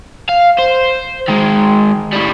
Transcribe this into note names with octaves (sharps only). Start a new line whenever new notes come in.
F5
C5
D#3 G#3
A2 G3